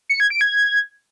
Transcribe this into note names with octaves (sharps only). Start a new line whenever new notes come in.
C#7
G#6
D7
G#6